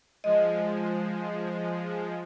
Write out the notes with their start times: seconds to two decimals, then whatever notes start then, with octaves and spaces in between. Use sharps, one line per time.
0.24 F3 G#3 D#5